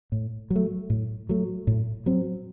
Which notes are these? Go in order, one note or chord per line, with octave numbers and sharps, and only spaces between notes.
A2
F#3
A3
A2
F#3 A3
A2
F#3 C4